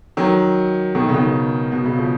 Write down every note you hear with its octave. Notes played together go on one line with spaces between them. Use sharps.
D#3 F#3
B2 D#3
C#3
B2 D#3
B2
C#3
C#3 F3